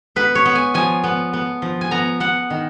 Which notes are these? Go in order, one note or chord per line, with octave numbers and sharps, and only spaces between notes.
B3 B4
C#5
B3
G#5
F3 G#5
B3
B3
F3
G#5
B3 A#5
B3 F#5
D#3